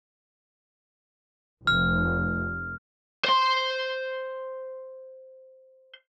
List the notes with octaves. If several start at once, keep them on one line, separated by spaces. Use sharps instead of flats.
F1 F6
C5 C6